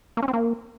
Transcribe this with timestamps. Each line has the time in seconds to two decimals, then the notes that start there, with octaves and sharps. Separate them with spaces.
0.17 A#3
0.23 C#4
0.28 C4
0.33 A#3